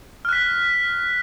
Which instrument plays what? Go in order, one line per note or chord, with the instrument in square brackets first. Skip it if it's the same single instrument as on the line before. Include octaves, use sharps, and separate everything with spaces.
[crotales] F6
F#6
B6